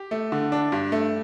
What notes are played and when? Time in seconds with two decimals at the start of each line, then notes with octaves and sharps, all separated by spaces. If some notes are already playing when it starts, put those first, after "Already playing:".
Already playing: G4
0.11 A3
0.32 D3
0.52 D4
0.72 G2
0.92 A3